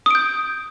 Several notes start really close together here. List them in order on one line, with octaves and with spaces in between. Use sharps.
D#6 D7 G6